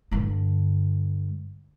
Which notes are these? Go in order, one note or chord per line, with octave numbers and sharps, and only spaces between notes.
G2 D3